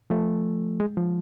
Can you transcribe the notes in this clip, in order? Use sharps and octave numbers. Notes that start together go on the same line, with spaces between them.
F3 A3
G#3
F3